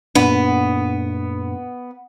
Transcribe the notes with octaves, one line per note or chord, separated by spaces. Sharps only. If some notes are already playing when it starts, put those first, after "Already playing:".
F#2 A#2 B3 D4